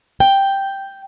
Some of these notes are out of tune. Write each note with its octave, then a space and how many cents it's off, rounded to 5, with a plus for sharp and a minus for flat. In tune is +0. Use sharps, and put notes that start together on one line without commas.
G5 +0